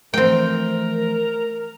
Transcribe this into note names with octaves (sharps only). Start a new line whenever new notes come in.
E3 F3 A3 C4 A#4 G5